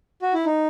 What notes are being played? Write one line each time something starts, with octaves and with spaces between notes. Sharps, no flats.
F#4
E4
D#4